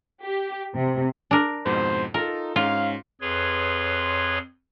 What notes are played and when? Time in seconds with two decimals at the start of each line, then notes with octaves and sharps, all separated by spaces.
0.22 G4
0.75 C3
1.31 D4 A#4
1.65 F2 G#2 B2 C5
2.14 D#4 F4 A4 A#4
2.56 G#2 C#4 F4 F5
3.21 F2 G#4 B4 C#5 C6